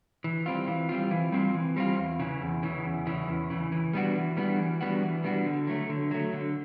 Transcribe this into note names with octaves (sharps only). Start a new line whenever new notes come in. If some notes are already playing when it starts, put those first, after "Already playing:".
E3
G3 C4 F4
E3
G3 C4 F4
E3
G3 C4 F4
E3
G3 C4 F4
E2
C#3 E3
E2
C#3 E3
E2
C#3 E3
E2
C#3 E3
E3
G3 B3 D4 F#4
E3
G3 B3 D4 F#4
E3
G3 B3 D4 F#4
E3
G3 B3 D4 F#4
D3
F#3 A3
D3
F#3 A3
D3